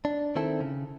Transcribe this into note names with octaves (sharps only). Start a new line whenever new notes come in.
D4
D#3 C4 E4 A4
C#3